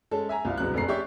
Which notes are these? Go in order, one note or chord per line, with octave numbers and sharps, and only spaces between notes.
G#3 C#4 A4
E5 G#5 A#5
C2 C3 F4
E1 C2 F#3 F#6
F1 A#1 A3 A#5 C7
C#4 G4 G#4 D5 E5 C#6